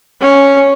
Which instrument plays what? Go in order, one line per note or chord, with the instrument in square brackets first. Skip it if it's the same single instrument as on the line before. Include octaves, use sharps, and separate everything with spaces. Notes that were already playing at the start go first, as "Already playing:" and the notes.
[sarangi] C#4